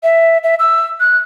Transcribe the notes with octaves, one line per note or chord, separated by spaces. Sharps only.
E5
E5
E6
F#6